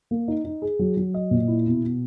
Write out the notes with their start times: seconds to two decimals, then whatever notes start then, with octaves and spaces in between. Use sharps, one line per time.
0.11 A#3
0.28 D#4
0.44 D#4
0.62 G#4
0.79 F#3
0.97 F#3
1.14 D#5
1.31 A#2
1.48 E4
1.66 B2
1.83 B2